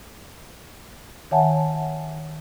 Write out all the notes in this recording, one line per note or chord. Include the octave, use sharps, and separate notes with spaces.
D#3 C#5 E5 F#5 G#5 A5